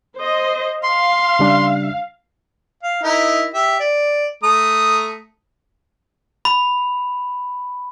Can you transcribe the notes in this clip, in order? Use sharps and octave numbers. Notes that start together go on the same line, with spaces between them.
C5 D#5
F5 C6
C#3 G3 D4
F5
D#4 E4 A#4
G4 E5
D5
A3 A#5 D#6
B5